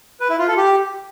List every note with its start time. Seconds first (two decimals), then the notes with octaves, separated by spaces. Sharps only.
0.20 B4
0.29 E4
0.39 F4
0.48 A4
0.57 G4